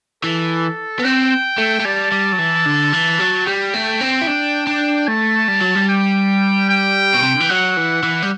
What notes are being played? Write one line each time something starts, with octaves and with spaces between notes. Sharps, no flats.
E3 A4
B3
C4 G5
A3
A3
G3 A5
G3
F#3
E3
D3
E3
F#3
G3 G5
A3
C4
E4
D4
D4
A3 A5
G3
F#3
G3
G5
G5
B2
C3
D3
E3
F#3 F#5
E3
E3
G3